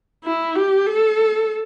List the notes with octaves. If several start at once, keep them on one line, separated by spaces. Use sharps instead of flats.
E4
G4
A4